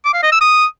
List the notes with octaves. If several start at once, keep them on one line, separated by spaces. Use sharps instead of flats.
D6
F5
D#5
E6
D#6